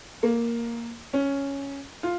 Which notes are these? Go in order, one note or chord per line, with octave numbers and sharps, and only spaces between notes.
A#3
C#4
F4